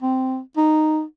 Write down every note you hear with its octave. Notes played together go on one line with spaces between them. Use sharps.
C4
D#4